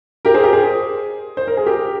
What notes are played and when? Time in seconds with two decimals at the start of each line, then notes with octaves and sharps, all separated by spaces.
0.25 G4 A#4
0.34 G#4 C5
0.43 G4 A#4
0.53 G#4 C5
1.37 C5
1.47 A#4
1.57 G#4
1.66 G4 A#4